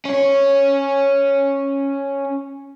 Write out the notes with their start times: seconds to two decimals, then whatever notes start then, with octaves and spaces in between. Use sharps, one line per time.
0.05 C#4 C#5